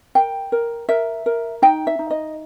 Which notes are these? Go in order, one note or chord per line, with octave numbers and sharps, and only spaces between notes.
A#4 G5
A#4
A#4 E5
A#4
D#4 G5
E5
D#4
D#5